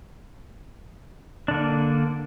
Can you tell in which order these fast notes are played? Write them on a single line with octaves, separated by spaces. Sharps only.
D4 D3 A#3